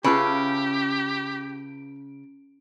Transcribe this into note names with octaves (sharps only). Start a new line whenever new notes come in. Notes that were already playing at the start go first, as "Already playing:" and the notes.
C#3 C#4 G4 B4 E5 F5 D7